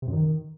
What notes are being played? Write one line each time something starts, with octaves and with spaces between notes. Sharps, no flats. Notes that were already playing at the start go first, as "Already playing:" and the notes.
C3
F#2
D#3